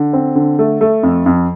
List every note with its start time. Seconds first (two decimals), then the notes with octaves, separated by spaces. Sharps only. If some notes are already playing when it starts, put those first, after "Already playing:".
Already playing: D3
0.13 C4
0.35 D3
0.59 A3
0.81 A3
1.03 F2
1.26 F2